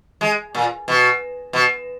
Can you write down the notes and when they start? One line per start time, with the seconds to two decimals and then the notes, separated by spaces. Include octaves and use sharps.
0.21 G#3
0.55 A#2
0.88 B2
1.53 B2